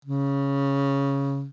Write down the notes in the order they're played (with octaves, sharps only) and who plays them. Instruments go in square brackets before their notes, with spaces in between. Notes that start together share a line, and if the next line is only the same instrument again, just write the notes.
[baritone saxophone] C#3